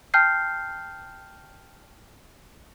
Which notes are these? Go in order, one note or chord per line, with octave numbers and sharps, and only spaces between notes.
G5 A5 F6 G6 C7